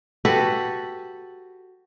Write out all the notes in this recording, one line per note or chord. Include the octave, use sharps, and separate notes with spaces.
F#4 G4 A4 B4